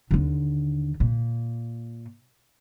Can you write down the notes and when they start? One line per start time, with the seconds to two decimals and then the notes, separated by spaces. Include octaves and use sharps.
0.11 D#2 D3
1.00 A#2